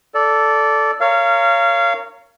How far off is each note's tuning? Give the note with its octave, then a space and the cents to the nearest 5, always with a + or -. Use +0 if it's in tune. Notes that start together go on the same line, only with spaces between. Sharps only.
A4 +0 D5 -15
A#4 -20 C#5 +10 F5 -25